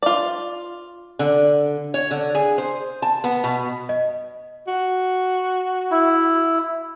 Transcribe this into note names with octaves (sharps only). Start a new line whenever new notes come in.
F4 D5
D3
C#5
D3
G#4
C5
A5
B3
B2
D#5
F#4
E4